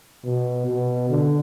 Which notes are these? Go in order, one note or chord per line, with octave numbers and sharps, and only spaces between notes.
B2
B2
D3